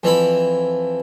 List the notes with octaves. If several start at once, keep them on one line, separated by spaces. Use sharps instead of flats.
F2 E3 E4 B5